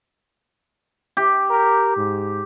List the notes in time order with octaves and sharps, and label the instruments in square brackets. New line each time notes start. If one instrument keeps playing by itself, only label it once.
[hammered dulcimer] G4
[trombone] A#4
G#2